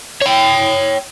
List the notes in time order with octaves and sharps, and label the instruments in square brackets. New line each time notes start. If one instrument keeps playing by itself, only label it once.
[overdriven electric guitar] C#5 G5